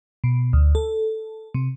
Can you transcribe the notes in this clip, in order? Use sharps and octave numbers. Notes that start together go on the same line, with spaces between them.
B2
D2
A4
C3